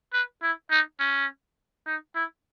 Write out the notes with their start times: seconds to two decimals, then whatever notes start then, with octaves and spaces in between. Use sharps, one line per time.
0.13 B4
0.43 E4
0.71 D#4
1.00 C#4
1.87 D#4
2.15 E4